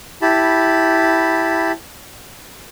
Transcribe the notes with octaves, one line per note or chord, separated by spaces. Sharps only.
E4 G4 A5 B5